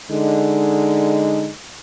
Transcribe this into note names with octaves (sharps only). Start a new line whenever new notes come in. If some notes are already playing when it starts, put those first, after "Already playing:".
D3 G#3 D#4